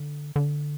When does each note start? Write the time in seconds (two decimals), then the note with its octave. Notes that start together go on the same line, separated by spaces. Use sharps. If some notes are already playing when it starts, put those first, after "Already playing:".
Already playing: D3
0.36 D3